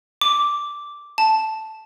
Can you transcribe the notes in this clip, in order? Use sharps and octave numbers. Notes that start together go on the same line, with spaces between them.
D6
A5